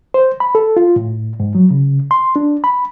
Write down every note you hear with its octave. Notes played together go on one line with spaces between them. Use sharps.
C5
B5
A4
F4
A2
G#2
F#3
C#3
C6
D4
B5